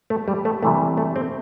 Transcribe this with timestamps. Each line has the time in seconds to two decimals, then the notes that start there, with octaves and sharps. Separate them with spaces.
0.10 A3
0.28 G3
0.45 A3
0.63 C3 E3 G3 A3
0.97 A3
1.16 C4